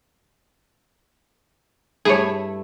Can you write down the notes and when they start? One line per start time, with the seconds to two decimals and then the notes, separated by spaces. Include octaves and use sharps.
2.05 G2 A3 E4 G#4 C#5